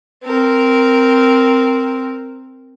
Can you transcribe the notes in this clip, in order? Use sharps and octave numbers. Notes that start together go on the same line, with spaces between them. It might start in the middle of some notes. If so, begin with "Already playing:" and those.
C4 A#4